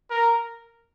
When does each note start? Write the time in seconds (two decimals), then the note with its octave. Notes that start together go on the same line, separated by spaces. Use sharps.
0.11 A#4